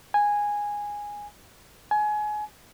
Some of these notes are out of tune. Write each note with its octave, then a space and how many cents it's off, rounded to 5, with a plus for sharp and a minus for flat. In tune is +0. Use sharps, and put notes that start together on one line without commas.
G#5 -10
G#5 +25